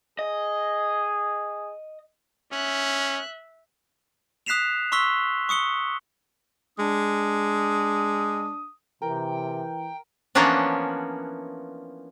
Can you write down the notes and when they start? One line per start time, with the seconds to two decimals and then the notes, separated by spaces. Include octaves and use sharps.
0.19 G#4 D#5
2.53 C#4 E5 F#6
4.46 D#6 F#6 B6 C7 E7 F7
4.92 C6 C#6 E6 B6 G7
5.49 C#6 D#6 C#7 G7
6.79 G#3 D4 D#6
9.02 C3 E3 A#4 G5
10.35 E3 F3 A#3 B3 C#4 D4